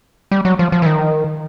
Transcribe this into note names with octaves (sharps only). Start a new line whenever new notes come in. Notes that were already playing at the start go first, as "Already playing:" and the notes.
G3
F#3
F3
F3
E3
D#3